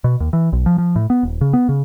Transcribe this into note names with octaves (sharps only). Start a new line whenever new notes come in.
B2
D#2
E3
B1
F3
F3
A2
B3
D#1
C#3
B3
C#3